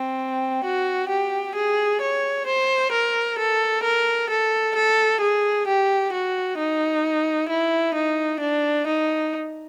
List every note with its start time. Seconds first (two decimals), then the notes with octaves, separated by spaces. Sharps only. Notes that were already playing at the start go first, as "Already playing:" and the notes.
Already playing: C4
0.64 F#4
1.09 G4
1.56 G#4
2.01 C#5
2.47 C5
2.92 A#4
3.39 A4
3.83 A#4
4.30 A4
4.76 A4
5.21 G#4
5.67 G4
6.13 F#4
6.59 D#4
7.49 E4
7.95 D#4
8.40 D4
8.87 D#4